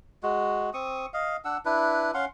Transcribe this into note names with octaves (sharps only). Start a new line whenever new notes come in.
G#3 F#4
C4 C#6 D#6
D#5 F5
D4 F#5 E6
D4 E4 B4
C#4 F5 F#5 C6